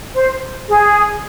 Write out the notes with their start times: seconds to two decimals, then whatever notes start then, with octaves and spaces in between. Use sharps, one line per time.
0.14 C5
0.69 G#4